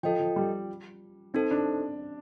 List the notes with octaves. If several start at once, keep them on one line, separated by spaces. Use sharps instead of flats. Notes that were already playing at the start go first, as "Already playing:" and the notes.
F3 F4 A4 D#5 G5
F3
G3
C4 D#4 A4 C5
D4